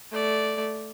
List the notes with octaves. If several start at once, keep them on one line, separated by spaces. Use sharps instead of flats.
A3 D5